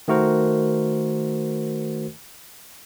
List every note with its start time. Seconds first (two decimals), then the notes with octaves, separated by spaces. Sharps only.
0.08 D#3 A3 F#4 A#4 C5